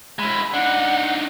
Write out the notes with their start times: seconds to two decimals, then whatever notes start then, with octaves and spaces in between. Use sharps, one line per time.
0.19 G#3 E4 B5
0.54 D4 D#4 F#5